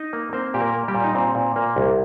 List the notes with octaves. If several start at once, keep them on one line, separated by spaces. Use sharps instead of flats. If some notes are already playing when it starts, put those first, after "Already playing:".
Already playing: D#4 D#5
A#3
A#3 C4 C5
A#2 G4
A#3 A#4
A#3
G3 G4
A#2
D#4
A#2 C4
A#2
A#2 A#3
C2